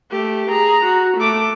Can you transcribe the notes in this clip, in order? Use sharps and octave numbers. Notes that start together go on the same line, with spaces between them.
A3 G4
G#4 A#5
F#4
A3 D6